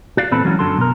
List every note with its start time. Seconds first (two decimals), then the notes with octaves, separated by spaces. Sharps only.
0.17 F#4 D5 F5
0.31 E2 A#2 C4 A4 B4 B5
0.44 E3 F#3 G#3 C#4 F4 F#4
0.59 F#2 D3 F#3 A4 C6
0.78 B2 A#4